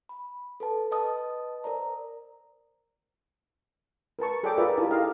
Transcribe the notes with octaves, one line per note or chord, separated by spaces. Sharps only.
B5
A4 B4 A5
B4 D#5 A5 D#6
A#4 C5 D5 A#5
A#4 B4 A5 C#6
G#4 A4 C#5 D5 G5 D6
F4 G#4 A#4 B4 D5 E5
E4 F4 G4 A#4 A5
D#4 G4 A4 D#5 F5